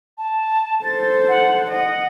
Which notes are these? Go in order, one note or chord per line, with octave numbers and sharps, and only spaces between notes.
A5
A4 C5 A6
F#5
D#5 F#5